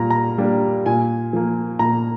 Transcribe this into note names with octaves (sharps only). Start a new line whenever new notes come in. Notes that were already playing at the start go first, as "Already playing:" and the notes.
Already playing: A#2 G3 A#3 A#5
A#5
G3 A#3 D4
A#2 G#5
F3 A#3
A#2 A#5